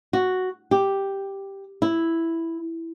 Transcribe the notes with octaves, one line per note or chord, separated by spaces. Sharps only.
F#4
G4
E4